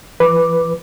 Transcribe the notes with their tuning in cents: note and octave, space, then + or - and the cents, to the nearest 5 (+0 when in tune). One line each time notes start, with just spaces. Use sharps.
E3 +45 B4 +0 D6 +0